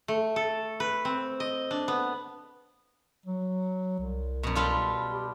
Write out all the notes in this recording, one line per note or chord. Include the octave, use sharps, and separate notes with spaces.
A3
A4
B4
C4
D#5
D4
B3
F#3
C2
F#2 B2
G3 F4 A4
G4